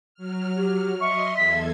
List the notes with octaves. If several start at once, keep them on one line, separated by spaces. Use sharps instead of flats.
F#3 F6
G4
D#5 E5 C6 C#6
E2 A4 G#6 B6